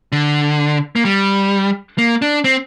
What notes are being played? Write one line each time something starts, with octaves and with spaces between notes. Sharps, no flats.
D3
A#3
G3
A#3
D4
C4